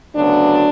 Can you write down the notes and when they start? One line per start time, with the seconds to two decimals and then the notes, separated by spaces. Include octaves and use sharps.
0.15 D2 C#3 F#3 B3 D4